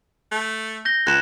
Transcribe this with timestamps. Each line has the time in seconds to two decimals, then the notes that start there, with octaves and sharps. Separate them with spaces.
0.32 A3
0.85 G6 A#6 G7
1.07 C#2 F#6 G#6 E7